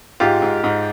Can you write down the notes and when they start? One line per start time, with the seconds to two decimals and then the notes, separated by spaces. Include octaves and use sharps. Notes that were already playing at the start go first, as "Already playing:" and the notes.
0.20 G#2 F4 G4
0.42 G#2
0.64 G#2